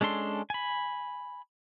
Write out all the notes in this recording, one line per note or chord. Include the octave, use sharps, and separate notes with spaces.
G#3 C#4 D4 A4 C6
G#5 B5